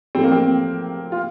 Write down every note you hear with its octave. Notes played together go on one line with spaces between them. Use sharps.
A2 F3 A3 C4
A#3
C4
F4